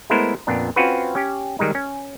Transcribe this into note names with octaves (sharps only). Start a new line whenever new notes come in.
G#3 A3 B3 E4 A#4 C5
F2 A#2 B3 D4
C4 C#4 F4 F#4 B4
C#4 G4
D#3 G3 G#3 D#4
C#4